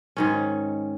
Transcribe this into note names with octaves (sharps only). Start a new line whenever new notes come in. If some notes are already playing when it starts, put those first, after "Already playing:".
G#2 D#3 C#4